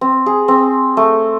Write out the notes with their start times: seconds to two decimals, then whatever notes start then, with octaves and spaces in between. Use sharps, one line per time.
0.01 C4
0.26 G#4
0.48 C4
0.97 A3